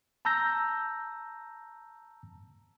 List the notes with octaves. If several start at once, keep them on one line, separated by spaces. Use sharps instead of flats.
A5 A#5 E6 G6 A#6